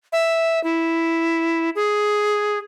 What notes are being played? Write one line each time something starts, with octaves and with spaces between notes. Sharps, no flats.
E5
E4
G#4